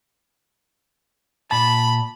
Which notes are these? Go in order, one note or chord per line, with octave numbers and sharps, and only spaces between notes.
A#2 A5 B5